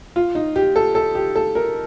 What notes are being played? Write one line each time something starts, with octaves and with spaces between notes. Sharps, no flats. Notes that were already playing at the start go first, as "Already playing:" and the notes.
F4
D#4
G4
A4
A4
G4
A4
A#4